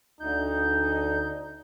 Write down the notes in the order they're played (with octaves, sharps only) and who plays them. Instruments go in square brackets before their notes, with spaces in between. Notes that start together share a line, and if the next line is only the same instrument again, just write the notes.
[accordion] D2 G6 [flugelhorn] D#4